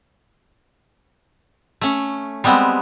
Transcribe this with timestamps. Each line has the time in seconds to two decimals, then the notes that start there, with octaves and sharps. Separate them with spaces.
1.81 A3 C#4
2.44 G3 G#3 B3 C4